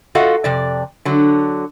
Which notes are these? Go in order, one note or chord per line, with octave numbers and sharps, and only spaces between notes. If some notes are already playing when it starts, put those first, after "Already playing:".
F4 F#4 A4 D#5 F5 F#5
F2 C3 D5
D3 F#3